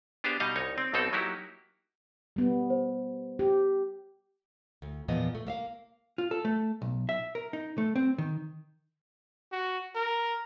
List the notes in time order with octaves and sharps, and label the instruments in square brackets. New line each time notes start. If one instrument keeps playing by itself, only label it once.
[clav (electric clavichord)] B3 D4 G4 G#4 C5 F5
B2 G3 D#4 D#5 F5 A#5
C2 D#4 C#5
C4
B1 B2 C4 D#4 A4
F#3 A#3 D#4 E4 F#4 G4
[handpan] G3 B3
[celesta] C5
[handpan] G4
[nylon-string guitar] D2
E2 A#2 F3 B3 D#5
A3
A#3 E5 F5
[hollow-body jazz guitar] F4
A4
A3
B1
E5
A#4
D#4
A3
C4
D#3
[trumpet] F#4
A#4